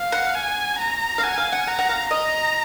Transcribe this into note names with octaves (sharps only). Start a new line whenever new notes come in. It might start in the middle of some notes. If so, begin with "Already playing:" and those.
Already playing: F5
F#5
G#5
A#5
F5
F#5 G#5
F5
F#5
F#5 A#5
F#5
F5
D#5 A#5